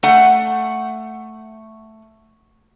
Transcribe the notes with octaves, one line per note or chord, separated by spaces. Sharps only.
A3 F#5